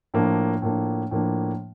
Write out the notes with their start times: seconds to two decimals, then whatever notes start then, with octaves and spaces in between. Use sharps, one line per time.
0.14 A2 F3 A#3 D4
0.62 A2 F3 A#3 D4
1.11 A2 F3 A#3 D4